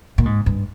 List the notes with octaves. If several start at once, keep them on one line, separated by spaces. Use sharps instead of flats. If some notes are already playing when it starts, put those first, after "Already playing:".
A#2
G#2
G2